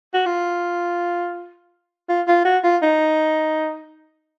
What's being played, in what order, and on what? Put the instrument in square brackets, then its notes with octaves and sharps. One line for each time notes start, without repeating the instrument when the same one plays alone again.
[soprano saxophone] F#4
F4
F4
F4
F#4
F4
D#4